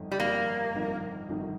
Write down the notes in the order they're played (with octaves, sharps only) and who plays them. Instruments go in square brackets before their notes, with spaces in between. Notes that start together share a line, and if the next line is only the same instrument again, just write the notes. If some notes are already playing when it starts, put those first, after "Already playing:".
Already playing: [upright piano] G1 F2 D#3
[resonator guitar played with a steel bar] G3
[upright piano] G1 F2 D#3 [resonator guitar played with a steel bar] A#3
[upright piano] G1 F2 D#3
G1 F2 D#3